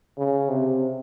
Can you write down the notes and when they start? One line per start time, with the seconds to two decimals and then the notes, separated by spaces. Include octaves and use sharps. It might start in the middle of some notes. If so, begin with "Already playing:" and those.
0.18 C#3
0.49 C3